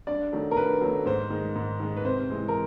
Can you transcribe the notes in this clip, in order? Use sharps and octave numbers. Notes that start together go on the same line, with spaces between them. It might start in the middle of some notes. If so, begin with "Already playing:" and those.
G2 D5
D#3 F#3 A3
A#4
G2 B4
D#3 F#3 A3
G#2 C5
D#3 G#3
G#2
D#3 G#3
B4
C3 C5
E3 G#3 C4
A#4